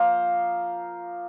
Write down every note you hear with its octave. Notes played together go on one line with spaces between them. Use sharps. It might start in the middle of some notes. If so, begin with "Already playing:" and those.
Already playing: F3 A#3 F4 A#4 C5